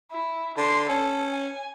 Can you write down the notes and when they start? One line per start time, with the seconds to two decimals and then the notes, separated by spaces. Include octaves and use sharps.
0.12 E4
0.58 D3 C6
0.89 C#4 A4
1.32 G#5